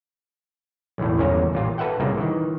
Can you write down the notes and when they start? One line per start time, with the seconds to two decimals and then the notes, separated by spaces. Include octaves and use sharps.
0.98 B1 E2 A2
1.17 G1 E2 A#3 C#4 A#5
1.53 A1 A#2 F4
1.78 A4 B4 E5 F#5 G5
2.00 C2 A#2 C#3 A#3
2.17 D#3 E3